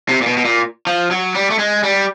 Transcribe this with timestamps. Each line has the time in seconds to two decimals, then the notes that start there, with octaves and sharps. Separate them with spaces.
0.09 C3
0.21 A#2
0.27 B2
0.38 B2
0.45 A#2
0.87 F3
1.11 F#3
1.35 G3
1.50 A3
1.59 G#3
1.83 G3